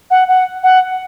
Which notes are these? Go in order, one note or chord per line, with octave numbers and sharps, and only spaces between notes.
F#5
F#5
F#5